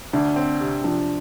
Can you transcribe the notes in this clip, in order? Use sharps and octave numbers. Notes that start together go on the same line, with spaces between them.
D2 D4
C4
C3
F3 D4